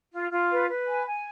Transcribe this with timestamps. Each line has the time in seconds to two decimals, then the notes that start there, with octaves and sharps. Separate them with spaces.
0.13 F4
0.31 F4
0.51 B4
0.69 B4
0.88 G#5
1.06 G#5